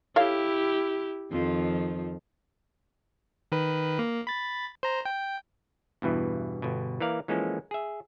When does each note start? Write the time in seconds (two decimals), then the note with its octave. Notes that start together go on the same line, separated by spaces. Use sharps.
0.16 E4 G4 A4 C#5 F5
1.31 F2 D#3 F3
3.52 D#3 B4
3.99 A#3
4.27 B5 A6
4.83 C5 A#5
5.05 G5
6.02 E2 G2 B2 E3
6.62 G1 B2
7.00 E3 A#3 A#4 D5 F5
7.28 E3 F3 G#3 A#3 C#4 A4
7.71 G#4 E5